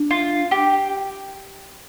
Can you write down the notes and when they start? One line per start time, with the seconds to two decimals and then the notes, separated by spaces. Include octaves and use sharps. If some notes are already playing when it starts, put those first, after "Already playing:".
Already playing: D4
0.10 F4
0.51 G4